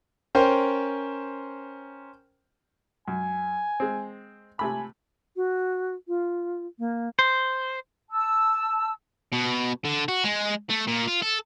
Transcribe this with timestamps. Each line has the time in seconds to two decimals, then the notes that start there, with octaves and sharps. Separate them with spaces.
0.35 C#4 A#4 C5 G5
3.08 F#2 G#5
3.80 G#3 C4
4.59 C3 A3 G#5 B5
5.36 F#4
6.08 F4
6.79 A#3
7.19 C5
8.10 A5 E6
9.33 B2
9.85 D3
10.08 F#4
10.24 G#3
10.70 A3
10.88 A#2
11.08 F4
11.22 A4